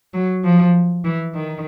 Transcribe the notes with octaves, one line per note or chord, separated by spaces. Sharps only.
F#3
F3
E3
D#3